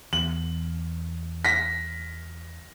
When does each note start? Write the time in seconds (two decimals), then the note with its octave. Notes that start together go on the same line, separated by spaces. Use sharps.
0.13 E2 F#7
1.45 A#6 B6